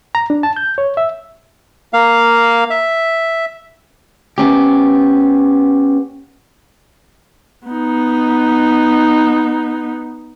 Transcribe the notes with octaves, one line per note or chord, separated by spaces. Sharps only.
A#5
D4
A5
G6
C#5
E5
A#3 F5
E5
B3 C#4 G4
B3 D#4